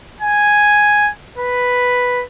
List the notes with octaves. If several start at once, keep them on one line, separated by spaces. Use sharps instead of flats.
G#5
B4